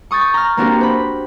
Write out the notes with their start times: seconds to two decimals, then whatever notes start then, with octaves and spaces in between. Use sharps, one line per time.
0.11 C#6 D#6 G6 A6
0.34 A#5 F6
0.57 A#3 C4 D4 F#4 G4 A#4
0.81 C5 B5